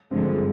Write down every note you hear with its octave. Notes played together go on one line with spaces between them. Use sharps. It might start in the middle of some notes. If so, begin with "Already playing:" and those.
G2 D3 F3 G#3 C4